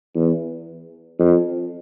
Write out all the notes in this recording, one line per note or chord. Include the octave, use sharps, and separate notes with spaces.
E2
F2